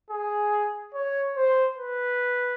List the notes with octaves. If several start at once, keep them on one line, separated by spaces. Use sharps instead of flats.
G#4
C#5
C5
B4